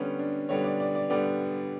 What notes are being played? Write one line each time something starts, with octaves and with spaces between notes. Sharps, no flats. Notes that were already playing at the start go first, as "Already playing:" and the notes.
Already playing: D3 G3 B3 C#4
D4
D3 G3 B3 C#5
D5
D5
D5
D3 G3 B3 D5